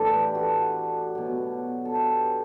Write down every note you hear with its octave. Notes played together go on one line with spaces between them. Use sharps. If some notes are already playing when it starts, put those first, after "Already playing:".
Already playing: A2 E3 D4 A4
G4 B4
F#4 A4
B2 F#3
A4
G4 B4